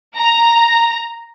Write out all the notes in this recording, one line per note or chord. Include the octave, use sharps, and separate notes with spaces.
A#5